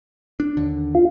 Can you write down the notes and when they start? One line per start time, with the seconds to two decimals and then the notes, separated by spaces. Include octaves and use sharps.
0.40 D4
0.57 D#2 D3
0.95 F4